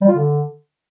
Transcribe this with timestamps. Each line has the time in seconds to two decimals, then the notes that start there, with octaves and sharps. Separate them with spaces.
0.02 G3
0.08 F4
0.15 D3